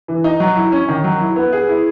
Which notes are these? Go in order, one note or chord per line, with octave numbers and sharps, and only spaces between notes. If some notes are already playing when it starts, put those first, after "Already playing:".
E3
D#4
F#3
E4
C#4
D#3
F#3
E4
B3
G#4
E4